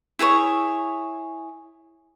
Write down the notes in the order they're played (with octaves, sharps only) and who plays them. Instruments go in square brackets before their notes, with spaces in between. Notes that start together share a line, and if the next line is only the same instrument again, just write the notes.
[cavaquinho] E4 G#4 B4 C#5